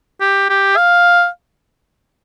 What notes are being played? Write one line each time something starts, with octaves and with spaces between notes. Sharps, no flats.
G4
G4
F5